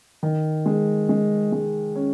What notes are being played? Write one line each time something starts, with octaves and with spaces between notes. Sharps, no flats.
D#3
G#3
G#3
G#3
C#4